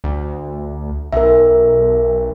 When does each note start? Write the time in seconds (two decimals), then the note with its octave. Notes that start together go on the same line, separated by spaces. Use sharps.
0.04 D2
1.13 B1 A#4 E5